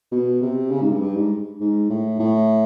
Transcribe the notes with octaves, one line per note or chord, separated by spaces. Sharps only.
B2
C3
C#3
G#2
G2
G2
G#2
G#2
A2
A2